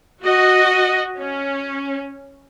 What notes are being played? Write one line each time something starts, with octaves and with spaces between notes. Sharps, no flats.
F#4 D#5
C#4